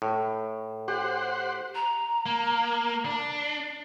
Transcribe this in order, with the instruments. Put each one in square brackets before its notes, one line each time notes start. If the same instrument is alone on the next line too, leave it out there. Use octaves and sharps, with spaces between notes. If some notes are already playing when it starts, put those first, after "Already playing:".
[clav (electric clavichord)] A2
[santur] G4 [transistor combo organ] C5 F#5
[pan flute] A#5
[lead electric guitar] A#3
D4